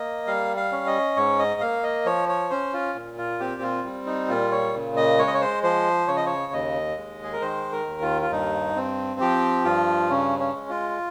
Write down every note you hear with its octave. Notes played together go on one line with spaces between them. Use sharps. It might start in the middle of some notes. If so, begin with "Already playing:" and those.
Already playing: A#3 D#5
G3 F5
F5
C#4
D#5
G#2 C#5
D#5
A#3 F5
D#5
F3 C#5
C#5
C#4 C5
F4
A#2
F4
C4 G4
F4
G3
D#4
A#2 F4
C#5
C#3
D#5
G#3 C#5
D#5
C#5
C5
F3 C5
C#3 C#5
D#5
C#5
D#2 D#5
G#3
G#4
A#4
D#3 C5
A#4
D#2
F4
F4
G2 D#4
C4
F3 G4
G2 F4
C#3 C#4
C#4
G#3
F4